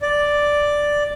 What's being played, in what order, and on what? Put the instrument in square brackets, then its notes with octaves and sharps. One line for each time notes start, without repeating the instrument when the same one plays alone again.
[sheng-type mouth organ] D5